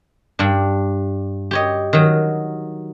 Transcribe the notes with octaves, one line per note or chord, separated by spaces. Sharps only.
G2 D4
G4 C#5 D#5
D#3 F#3